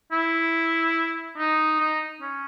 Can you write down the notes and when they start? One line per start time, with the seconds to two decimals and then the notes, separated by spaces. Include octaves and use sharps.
0.12 E4
1.37 D#4
1.80 D#4
2.21 C#4